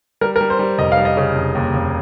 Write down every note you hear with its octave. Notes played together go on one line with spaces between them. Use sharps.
G3 A#4
A#4
G3
C5
G3
F1 D#5
F5
G3
D#5
C#3
F1
D#2
F1